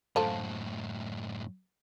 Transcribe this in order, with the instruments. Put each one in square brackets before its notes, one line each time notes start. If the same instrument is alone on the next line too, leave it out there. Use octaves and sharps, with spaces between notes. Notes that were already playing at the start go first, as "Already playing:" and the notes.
[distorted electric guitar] F#2 A2 [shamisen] F3 F4 A4